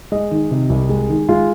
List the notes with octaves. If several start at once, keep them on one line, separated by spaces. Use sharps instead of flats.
G#3 D#5
D#3
C3
C2
G#3
D#3
G#3 F4